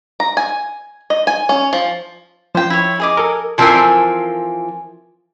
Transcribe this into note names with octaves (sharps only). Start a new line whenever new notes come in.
A#5
G#5
D#5
G#5
C#4
F3
F3 C5 G5
E4 C#5
G#4 D#5 D6
A4 A#4
E3 F3 C4 A4 A#4 G#5